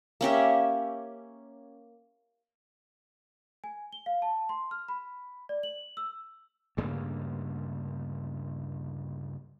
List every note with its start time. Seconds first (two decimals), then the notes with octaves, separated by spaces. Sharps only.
0.21 A#3 C#4 G4 E5
3.64 G#5
3.93 G7
4.06 F5
4.22 A5
4.49 C6
4.71 F6
4.88 B5
5.49 D5
5.63 F#7
5.97 E6
6.77 D2 G2 C#3 A#3